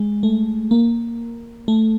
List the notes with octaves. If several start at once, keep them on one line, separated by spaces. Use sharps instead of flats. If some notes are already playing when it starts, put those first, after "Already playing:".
Already playing: G#3
A3
A#3
A3